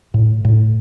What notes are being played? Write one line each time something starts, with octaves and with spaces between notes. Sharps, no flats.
A2
A2